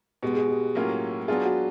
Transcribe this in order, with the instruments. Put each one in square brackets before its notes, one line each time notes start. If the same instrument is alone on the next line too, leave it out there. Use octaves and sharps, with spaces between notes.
[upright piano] B2 G#3 B3 [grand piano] G4
[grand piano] G#4
G4
[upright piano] A2 F#3 A#3 C#4 F4
[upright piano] F#3 B3 D4 F4 [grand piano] G#4
[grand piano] F#4